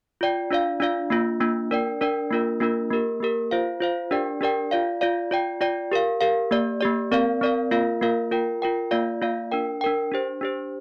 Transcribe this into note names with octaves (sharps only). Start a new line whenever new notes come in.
F4 D5 G5
D4 F4 D5 F5
D4 F4 D5 F5
A#3 D4 F4
A#3 D4 F4
D4 A#4 D5 G5
D4 A#4 D5 G5
A#3 D4 F4 A#4
A#3 D4 F4 A#4
A#3 G4 A#4
A#3 G4 A#4
F4 C5 F5
F4 C5 F5
D4 G4 A#4 D5 G5
D4 G4 A#4 D5 G5
F4 D5 F5
F4 D5 F5
F4 D5 G5
F4 D5 G5
G4 A#4 F5
G4 A#4 F5
A#3 G4 D5
A#3 G4 D5
C4 A#4 D5 F5
C4 A#4 D5 F5
A#3 F4 A#4 F5
A#3 F4 A#4 F5
F4 A#4 G5
F4 A#4 G5
A#3 F4 D5 F5
A#3 F4 D5 F5
D4 A#4 G5
D4 A#4 G5
D4 G4 C5
D4 G4 C5